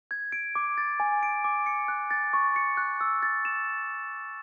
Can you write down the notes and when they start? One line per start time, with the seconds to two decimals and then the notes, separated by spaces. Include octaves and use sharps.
0.11 G#6
0.32 D7
0.55 D6
0.78 A6
1.00 G#5
1.23 D7
1.44 D6
1.66 C#7
1.88 F#6
2.11 A6
2.33 C#6
2.56 C#7
2.77 F#6
3.01 E6
3.23 A6
3.45 E7